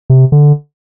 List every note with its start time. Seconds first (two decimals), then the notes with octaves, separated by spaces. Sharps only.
0.10 C3
0.32 D3